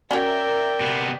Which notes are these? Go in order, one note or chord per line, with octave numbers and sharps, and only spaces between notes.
C#4 F#4 A#4 C#5 D5 E5 G5
C3 B3